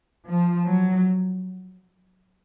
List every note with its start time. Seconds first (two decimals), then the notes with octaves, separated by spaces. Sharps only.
0.26 F3
0.68 F#3